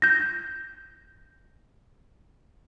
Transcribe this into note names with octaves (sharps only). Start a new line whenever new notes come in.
G6 A#6